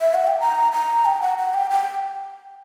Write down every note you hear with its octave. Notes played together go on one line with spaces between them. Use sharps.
E5
F#5
G5
A#5
A#5
G5
F#5
F#5
G5
G5